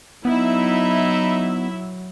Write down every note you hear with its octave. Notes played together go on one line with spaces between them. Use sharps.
F#3 B3 D#4 E4 E5